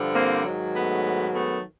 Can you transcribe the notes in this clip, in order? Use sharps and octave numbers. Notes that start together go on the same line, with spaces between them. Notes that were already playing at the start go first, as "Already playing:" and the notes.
Already playing: G2 D3 F3
A#3 C4
G#2 D#3 F#3
A3 B3
A3 B3